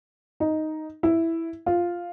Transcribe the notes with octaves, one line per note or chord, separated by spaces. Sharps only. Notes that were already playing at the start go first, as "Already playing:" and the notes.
D#4
E4
F4